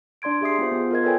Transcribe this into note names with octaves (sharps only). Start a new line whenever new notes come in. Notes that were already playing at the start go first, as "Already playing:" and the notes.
D4 D5 C6 G#6 D7
G4 G#4 E5 C6 D#6 C7
B3 F4 C5
B3 G#4
F4 A#4 D#5 G#6
A4 B4 C#5 D#5 G5 G#5